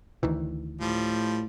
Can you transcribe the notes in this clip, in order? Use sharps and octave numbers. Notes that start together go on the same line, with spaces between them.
D2 D#3 E3
A2 F3 G3